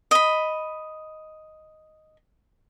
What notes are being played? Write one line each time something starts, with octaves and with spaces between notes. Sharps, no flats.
D#5 B5